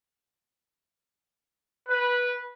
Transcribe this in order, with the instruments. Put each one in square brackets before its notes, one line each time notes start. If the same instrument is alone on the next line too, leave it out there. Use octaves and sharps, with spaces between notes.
[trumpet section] B4